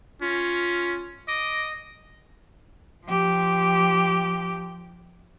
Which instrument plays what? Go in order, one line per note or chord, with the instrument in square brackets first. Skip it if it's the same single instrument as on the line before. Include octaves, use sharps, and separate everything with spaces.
[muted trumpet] C#4 [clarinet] F4
[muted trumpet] D#5 [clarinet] D6
[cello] F3 G4